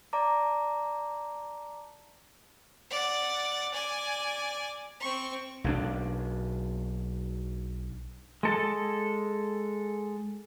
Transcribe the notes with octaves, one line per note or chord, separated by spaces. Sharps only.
D5 A5 A#5 D6
D5 F#5
D5 G#5
C4 C#6
B1 D#3 D4
G#3 A4